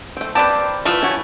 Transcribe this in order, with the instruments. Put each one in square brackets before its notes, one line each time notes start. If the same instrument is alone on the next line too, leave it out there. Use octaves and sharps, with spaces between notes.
[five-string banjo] A3 C4
[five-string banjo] A#3 C4 G4 [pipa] B4 D5 A5
[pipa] E3 F3 A3 [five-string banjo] F4 B4
[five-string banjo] C#4 E4 F#4